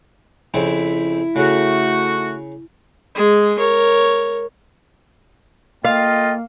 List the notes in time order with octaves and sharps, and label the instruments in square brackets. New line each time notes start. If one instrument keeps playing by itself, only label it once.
[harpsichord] F2 C#3 C4 [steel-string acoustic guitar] E4
[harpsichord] C#3 [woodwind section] A3 F#4
[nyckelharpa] G#3 G#4
A#4 C#5
[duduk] A#3 [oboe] F4 [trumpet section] A4 D#5 G5 [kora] F5